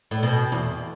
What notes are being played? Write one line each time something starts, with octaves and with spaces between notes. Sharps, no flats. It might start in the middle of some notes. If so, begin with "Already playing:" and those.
A2
B2
E2